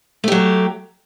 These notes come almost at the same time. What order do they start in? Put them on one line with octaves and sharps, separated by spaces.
A3 G4 F#3